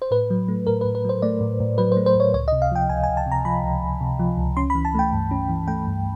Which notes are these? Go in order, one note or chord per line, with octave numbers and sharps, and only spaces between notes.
C5
A2 B4
F#3
A3
A2 A#4
B4
A2
B4
F#3 C5
A3 D5
A2
A2
F#3 B4
C5
A3
C5
A2 C#5
C#2 C#5
D#5
C3
F5
F3 G5
C#2 G#5
G#5
C#2
A5
C3
A#5
F3 B5
C#2
C#2
C3
F3
C#2
C#4 C6
B5
E3
A5
A3 G5
G2
C#4
E3
A3 G5
G2